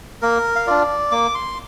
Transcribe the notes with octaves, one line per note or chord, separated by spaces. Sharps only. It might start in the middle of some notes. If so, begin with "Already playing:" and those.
A#3 A#4
F5
D4 F4 D5
A#3 D6
C6